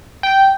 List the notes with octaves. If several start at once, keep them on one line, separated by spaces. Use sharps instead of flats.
G5